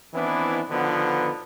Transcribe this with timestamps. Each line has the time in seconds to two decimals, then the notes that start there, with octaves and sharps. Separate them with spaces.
0.14 D#3 E3 B3 C4 D4 E4
0.70 B2 D3 D#3 F3 B3